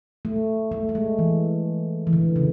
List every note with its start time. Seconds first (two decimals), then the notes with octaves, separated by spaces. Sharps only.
0.25 A3
0.72 A3
0.89 A3
0.95 G#3
1.19 E3
2.07 E3
2.13 D3
2.36 C#3